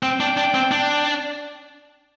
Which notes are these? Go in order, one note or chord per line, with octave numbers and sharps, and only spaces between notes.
C4 G5
D4
D4
C4
D4